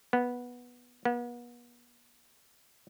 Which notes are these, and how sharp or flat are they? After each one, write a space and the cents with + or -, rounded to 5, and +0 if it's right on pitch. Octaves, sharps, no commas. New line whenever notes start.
B3 -10
B3 -40